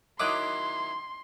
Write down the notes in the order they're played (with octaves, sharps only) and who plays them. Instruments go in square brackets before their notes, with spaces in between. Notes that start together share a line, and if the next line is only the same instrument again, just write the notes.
[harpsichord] D#3 F#3 E4 [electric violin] C6 [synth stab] D6 D#6 F#6